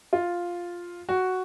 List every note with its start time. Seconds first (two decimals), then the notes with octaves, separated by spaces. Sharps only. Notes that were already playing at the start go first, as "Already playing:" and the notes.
0.13 F4
1.09 F#4